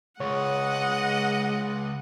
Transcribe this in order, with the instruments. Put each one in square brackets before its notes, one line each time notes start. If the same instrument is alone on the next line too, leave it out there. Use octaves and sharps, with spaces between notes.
[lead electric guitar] C#2 [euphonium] G#3 [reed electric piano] C#5 [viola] D#5 F#5